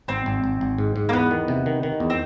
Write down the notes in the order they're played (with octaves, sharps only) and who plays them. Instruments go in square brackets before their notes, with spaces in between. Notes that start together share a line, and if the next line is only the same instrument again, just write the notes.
[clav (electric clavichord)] G#1 [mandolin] C4
[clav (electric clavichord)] G#1
G#1
G#1
G#2
G#2
[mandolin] A#3
[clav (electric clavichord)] E2 [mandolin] B3
[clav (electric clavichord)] D#3
C3
D#3
D#3
E2
[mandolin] C4